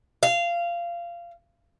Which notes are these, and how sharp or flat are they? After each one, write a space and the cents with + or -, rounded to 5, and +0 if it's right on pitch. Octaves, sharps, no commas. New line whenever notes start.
F5 -20